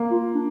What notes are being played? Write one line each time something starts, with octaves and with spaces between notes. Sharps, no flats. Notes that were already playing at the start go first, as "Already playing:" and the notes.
Already playing: A#3
F4
D4